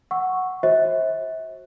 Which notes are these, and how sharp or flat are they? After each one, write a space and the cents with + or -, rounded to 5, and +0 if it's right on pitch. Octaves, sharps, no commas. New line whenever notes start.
F#5 +0 C#6 +0 E6 +0
F#4 +0 C5 +35 E5 -35